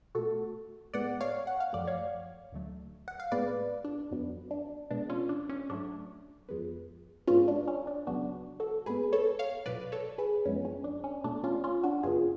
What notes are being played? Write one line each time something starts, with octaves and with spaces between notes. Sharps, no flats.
B2 A3 F#4 A4
A2 G#3 B3 D5 F#5
C#5 F5
F#5
F5
F#2 F3 A3 D5
C#5 F5
D2 D3 F#3 A3
F#5
F5
A2 G#3 B3 B4 D5
D4
F2 D3 F#3 B3
D4
B2 G#3 B3 D4
C#4 F4
D4
C#4
G#2 F#3 A3 D4
F2 F3 G#3 B3
G#2 G#3 B3 C#4 F4
D4
C#4
D4
C#2 C#3 F#3 B3 D4 F#4
F#4 A4
G#2 G#3 B3 G#4 B4
A4 C#5
C#5 F5
C#2 B2 F#3 B4 D5
A4 C#5
G#4 B4
F#2 F3 G#3 B3 C#4
C#4
D4
C#4
B2 A3 D4
C#4 F4
C#4 F4
D4 F#4
F#2 C#3 F#3 B3 F4 G#4